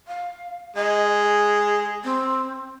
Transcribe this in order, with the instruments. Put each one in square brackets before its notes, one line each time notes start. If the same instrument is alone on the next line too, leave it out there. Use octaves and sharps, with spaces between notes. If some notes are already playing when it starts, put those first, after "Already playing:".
[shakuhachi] F5
[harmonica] G#3 [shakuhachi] D#5
[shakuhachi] G#4
C4